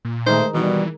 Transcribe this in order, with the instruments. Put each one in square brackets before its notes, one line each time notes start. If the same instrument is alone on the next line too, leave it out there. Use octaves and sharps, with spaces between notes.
[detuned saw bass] A#2
[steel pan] D#3 G#3 D#4 [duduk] A3 [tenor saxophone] C5
[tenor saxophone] B2 [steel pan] D#3 [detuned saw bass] E3 [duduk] G3